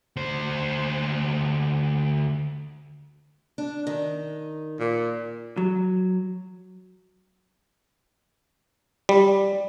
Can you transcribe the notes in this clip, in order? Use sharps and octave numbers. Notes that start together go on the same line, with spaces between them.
D2 C5
D4
D#3
A#2
F#3
G3